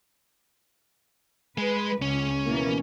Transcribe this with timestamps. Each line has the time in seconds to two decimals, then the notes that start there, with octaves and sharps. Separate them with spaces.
1.58 G#3 B4
2.02 C#2 C#4
2.46 B2 E3 A#3